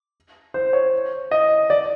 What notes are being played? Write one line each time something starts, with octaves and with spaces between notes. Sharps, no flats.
C5
C#5
D#5
D5